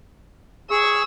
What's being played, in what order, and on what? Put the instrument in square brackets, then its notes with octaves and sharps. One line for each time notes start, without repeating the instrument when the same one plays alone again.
[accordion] G#4 C#6 [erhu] E6